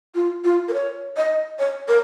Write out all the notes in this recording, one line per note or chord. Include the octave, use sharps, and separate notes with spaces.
F4
F4
A#4
C#5
D#5
C#5
A#4